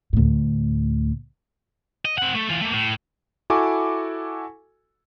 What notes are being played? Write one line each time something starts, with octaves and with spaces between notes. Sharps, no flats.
D2 A2
D#5
C4 F#5
A3
E3 F4
A3 A#3
A2
E4 F#4 A4 G#5 C#6 D6